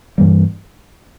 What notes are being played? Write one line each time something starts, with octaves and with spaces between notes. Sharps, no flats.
G2 E3 G3 A#3